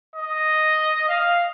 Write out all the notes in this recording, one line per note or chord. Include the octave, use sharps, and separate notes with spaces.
D#5
F5